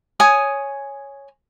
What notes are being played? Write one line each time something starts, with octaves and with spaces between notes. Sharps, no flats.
C#5 G#5 D#6